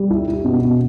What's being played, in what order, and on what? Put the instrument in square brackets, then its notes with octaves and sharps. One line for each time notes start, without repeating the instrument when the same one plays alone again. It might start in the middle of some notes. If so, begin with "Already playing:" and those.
Already playing: [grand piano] G3
E4
E4
B2
B2